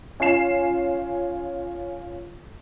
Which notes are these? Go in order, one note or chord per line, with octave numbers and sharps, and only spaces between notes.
C#4 F4 G#5 C7 E7